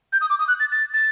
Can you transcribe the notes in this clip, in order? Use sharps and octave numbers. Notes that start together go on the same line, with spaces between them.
G6
D#6
D6
D#6
F#6
A6
A6
A6